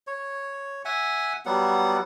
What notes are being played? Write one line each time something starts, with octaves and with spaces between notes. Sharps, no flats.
C#5
E5 F#5 G#5
F#3 G3 B3 F#5